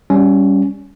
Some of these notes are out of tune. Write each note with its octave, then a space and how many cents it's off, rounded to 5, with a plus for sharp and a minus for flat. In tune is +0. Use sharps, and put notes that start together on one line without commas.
G3 +0 C#4 +10